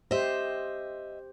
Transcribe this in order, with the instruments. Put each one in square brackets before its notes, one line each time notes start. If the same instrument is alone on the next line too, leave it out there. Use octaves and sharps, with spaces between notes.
[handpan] G4 C5 [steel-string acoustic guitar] D#5 E5